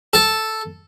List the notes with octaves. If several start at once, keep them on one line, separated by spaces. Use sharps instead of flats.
A4